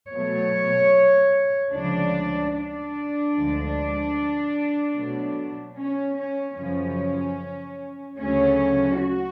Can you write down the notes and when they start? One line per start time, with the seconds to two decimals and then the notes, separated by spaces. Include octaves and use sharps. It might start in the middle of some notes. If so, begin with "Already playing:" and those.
0.11 B2 F#3 A3 C#5
1.72 D2 C#3 F3 G#3 D4
2.54 D4
3.34 D2 D3 F3 G#3
4.96 B2 F#3 A3
5.77 C#4
6.17 C#4
6.57 F#2 C#3 F3 C#4
8.19 D2 C#3 F#3 A3 C#4
9.00 F#4